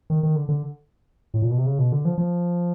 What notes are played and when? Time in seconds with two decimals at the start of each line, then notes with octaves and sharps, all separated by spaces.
0.10 D#3
0.23 D#3
0.36 D3
0.49 D3
1.34 A2
1.42 A#2
1.50 B2
1.58 C3
1.66 C#3
1.79 B2
1.92 D3
2.05 F3
2.18 F3